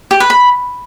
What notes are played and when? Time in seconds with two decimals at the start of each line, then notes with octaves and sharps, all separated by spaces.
0.11 G4
0.20 B4
0.30 B5